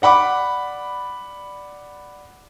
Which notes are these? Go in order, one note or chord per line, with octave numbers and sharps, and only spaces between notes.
D5 F#5 B5 D6